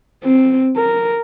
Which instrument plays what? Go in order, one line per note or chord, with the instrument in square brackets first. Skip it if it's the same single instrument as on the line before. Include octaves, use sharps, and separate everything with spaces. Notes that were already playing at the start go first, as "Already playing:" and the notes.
[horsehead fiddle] C4
A#4